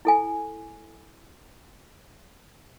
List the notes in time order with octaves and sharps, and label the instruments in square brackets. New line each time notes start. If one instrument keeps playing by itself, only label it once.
[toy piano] E4 A4 G#5